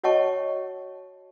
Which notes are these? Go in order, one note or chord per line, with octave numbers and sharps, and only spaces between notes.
F#4 C#5 D#5 F#5 A5 C#6